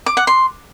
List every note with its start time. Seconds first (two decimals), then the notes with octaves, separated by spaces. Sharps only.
0.06 D6
0.17 F#5
0.27 C6